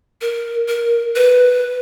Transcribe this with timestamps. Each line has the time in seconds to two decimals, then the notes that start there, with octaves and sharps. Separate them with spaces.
0.21 A#4
0.68 A#4
1.16 B4